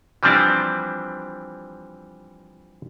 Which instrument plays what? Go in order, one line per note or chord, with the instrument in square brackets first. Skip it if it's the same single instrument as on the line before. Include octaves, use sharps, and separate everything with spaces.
[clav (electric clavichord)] E3 F3 G3 C4 D4 E4